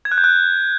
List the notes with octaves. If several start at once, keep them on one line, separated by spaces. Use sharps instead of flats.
G#6
F#6
G6
F#6